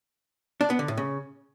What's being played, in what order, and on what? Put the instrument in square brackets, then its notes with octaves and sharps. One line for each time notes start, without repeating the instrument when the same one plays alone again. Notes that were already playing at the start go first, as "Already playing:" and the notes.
[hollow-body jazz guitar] D4
B3
D3
A2
C#3